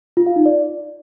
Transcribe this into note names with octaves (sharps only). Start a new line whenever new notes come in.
F4
F5
D#4
D5